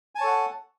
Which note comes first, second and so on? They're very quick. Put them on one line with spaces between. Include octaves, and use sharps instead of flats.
G#5 A5 C#5 A4 F#5